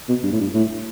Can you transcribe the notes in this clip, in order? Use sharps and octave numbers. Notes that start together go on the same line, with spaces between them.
B2
G2
A2
G2
A2